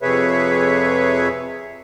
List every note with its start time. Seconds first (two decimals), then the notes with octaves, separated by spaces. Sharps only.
0.02 F2 C3 G#4 B4 C#5 E5